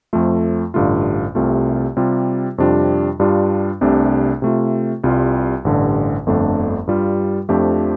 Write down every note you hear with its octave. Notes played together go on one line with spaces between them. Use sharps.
F2 F3 A3 F4
A1 G2 D3 A3 F4
C2 C3 A3 F4
C3 G3 F4
F2 C3 G3 D4 F4
G2 G3 D4 F4
C2 C3 A3 D4
C3 A3 F4
C2 C3 G3 F4
A1 G2 D3
G1 F2 D3 A3 D4
G2 G3 F4
F2 F3 A3 D4 G4